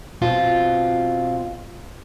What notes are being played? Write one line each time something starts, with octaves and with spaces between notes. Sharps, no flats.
B2 C4 F4